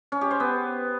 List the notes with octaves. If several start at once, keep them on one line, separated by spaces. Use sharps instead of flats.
C#4
G4
C5
B3